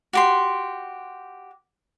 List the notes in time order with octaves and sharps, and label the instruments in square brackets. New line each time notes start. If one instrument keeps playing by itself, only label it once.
[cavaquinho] F#4 G4 C6